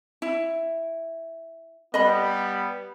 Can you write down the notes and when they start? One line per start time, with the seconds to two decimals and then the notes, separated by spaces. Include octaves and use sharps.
0.22 E4
1.94 G3 B3 D#5 B5